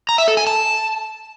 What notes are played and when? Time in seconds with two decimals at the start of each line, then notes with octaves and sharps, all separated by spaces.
0.09 A#5
0.18 E5
0.28 A4
0.37 G#5
0.47 A5